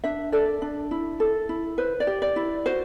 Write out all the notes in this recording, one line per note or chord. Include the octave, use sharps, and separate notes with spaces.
D4 E5
A4 D5
D4
E4
A4
E4
B4 C5
D5
G4
D5
E4
F#4 C5